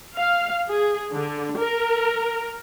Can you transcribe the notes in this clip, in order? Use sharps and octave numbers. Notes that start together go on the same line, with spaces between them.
F5
G#4
D3
A#4